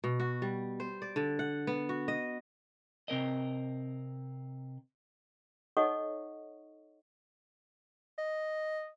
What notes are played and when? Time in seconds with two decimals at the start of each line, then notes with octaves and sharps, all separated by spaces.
0.04 B2
0.20 F#4
0.42 G3
0.80 C5
1.02 D5
1.16 D3
1.39 F#5
1.67 B3
1.89 F#4
2.08 D#5
3.08 C3 C4 A#4 D#5
5.77 D#4 A4 C#5 D#5 F#5 C#6
8.18 D#5